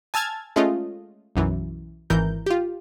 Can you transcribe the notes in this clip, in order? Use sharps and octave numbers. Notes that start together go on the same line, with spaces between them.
G#5 A5 E6 F6 G#6 A6
G#3 A3 C#4 F4 D#5
B1 F#2 E3
G#1 E3 A#4 G6
F4 G4